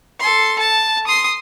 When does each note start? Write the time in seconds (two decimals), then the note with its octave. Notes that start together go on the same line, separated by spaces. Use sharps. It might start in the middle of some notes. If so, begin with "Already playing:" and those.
0.20 A4 C6
0.59 A5
1.07 C6 D#6